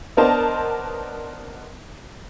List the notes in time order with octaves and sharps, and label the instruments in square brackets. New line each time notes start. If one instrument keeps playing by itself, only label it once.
[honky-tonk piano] B3 D4 A#4 C5 D#5 A5